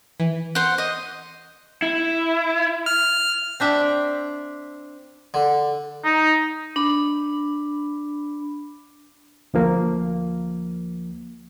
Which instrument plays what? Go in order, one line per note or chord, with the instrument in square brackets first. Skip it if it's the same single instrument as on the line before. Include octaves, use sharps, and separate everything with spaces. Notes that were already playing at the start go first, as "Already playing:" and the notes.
[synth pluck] E3
[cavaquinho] C5 F#5
D#5
[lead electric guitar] E4
[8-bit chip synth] F6
[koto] C4 D4 E5 G5
[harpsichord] D3
[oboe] D#4
[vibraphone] D4 B5
[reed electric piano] D2 F3 A#3